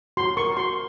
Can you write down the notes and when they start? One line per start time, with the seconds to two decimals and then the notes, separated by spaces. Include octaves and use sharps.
0.17 F#4 C6
0.37 A#4 C#6
0.57 F#4 C6